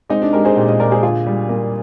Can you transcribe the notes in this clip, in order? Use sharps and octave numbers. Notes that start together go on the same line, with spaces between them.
G#3 C4 D#4
D4
G#3 G4 A#4
G#4 C5
A#2 G4 A#4
C5 D#5
A#2 A#4 D5
G#4 C5
D3 F4 G#4
G3
A#3